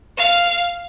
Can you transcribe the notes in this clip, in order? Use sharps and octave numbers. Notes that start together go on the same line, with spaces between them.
F5